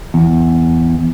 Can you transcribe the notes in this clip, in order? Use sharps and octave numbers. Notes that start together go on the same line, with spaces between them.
E2